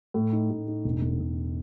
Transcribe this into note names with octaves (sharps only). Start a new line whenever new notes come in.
A2
D#4
A2
D#4
E1
E1
E1